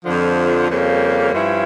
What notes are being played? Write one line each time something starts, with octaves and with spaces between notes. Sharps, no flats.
F2 D3 F3
F2 C#3 G3 A#3
G2 F3 C#4 E4